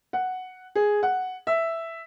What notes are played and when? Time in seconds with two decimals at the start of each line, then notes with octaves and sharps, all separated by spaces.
0.13 F#5
0.75 G#4
1.03 F#5
1.47 E5